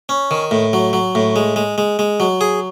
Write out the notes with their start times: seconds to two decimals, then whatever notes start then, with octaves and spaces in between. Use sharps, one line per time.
0.09 C#4
0.31 D#3
0.51 A2
0.73 F#3
0.93 F#3
1.15 A2
1.36 G#3
1.56 G#3
1.78 G#3
1.99 G#3
2.20 F#3
2.41 G#4